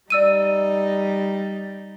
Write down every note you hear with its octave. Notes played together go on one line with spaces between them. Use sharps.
G3 D#4 D5 E6 D#7